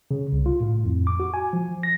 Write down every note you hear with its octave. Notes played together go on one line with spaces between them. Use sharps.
C#3
C2
F4
A2
F2
D6
F#4
G#5
F3
A#6